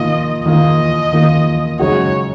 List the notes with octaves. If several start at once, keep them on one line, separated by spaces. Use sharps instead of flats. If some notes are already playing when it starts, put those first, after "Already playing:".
Already playing: D#3 A#3 F4 D#5
D#3 A#3 F4 D#5
D#3 A#3 F4
F#2 C#3 G#3 D#4 F#4 C#5